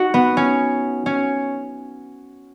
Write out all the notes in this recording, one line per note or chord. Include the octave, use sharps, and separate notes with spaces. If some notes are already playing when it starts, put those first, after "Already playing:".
Already playing: D#4 F#4
B3
C#4
C#4